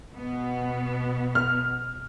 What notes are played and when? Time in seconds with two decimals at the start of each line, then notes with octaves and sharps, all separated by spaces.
0.13 B2 B3
1.35 F6